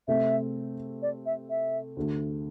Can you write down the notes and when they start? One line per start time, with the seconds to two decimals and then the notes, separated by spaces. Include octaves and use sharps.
0.08 C3 A3 C4 A4 E5
1.02 D5
1.26 E5
1.50 E5
1.97 D2 D3 A3